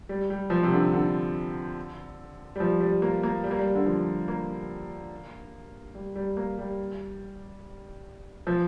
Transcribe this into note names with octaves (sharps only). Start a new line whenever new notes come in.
G3
G3
F3
C3
D3
D3
G3
F3
G3
A#3
A#3
G3
A#3
G3
D3
F3
A#3
G3
G3
A#3
G3
F3